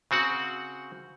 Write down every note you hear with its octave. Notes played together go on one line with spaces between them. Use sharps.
C#3 C4 F#4 F#5